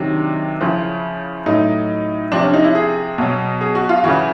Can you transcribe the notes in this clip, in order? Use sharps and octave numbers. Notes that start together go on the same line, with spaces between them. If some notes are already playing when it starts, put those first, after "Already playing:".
Already playing: C3 D#3 F#3 D4
C#3 F3 E4
A2 F#3 D#4
C3 F3 D4
C#4
D#4
E4
G#4
B2 F#3
G#4
F#4
F4
C#3 E3 F#4